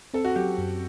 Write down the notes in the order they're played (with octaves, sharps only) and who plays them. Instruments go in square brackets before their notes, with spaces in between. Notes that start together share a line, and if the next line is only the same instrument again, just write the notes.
[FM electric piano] C4 [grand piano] A4
[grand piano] F#4
[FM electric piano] F#3 [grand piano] G4
[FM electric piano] F#2